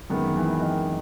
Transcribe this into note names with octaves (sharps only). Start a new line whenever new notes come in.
F#2 D#3 G#3 B3 D#4
E3
D#3